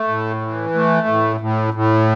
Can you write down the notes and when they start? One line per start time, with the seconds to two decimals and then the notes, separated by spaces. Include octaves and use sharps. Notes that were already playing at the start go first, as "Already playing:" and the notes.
Already playing: A3
0.08 A2
0.42 E3
0.75 A3
1.07 A2
1.40 A2
1.74 A2